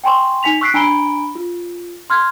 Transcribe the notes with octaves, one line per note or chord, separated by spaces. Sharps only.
G5 G#5 C6 C#6
D#4 G#5 B6 F7
C#6 E6 F#6 B6 C7 D7
D4 G#5 A#5 B5 D7 G7
F4
C6 F6 G#6